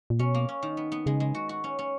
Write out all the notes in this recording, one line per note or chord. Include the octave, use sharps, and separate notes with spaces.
A#2
B2 C#4
A#3
C#4
D#3
B3
B3
C#3 G#3
G#3
F#4
F#4
C#4
C#4